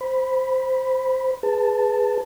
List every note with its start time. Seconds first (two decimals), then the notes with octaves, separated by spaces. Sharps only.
0.01 C5 B5
1.43 G#4 B4 A5